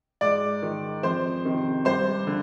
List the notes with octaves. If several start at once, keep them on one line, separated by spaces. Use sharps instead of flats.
G#2 D5 D6
D#3
F2 C5 C6
C3 D#3
G2 C5 C6
D3